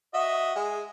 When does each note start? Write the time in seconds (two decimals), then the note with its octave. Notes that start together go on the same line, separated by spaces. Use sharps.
0.14 F#4 D#5 E5
0.56 G#3